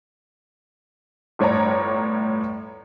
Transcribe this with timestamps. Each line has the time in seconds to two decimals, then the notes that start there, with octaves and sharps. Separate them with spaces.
1.39 G1 A2 C#5 D5 A#5